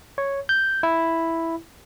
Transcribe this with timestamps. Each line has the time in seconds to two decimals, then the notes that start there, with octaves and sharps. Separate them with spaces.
0.18 C#5
0.49 G6
0.83 E4